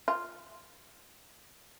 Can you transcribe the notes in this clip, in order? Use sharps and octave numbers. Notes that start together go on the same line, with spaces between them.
F4